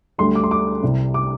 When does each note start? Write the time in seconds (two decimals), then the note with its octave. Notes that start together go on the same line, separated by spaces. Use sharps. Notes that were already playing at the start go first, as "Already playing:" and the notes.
0.18 D2 D3 G3 C6
0.35 D6
0.44 C6
0.51 D6
0.83 C2 C3 G3
1.14 D6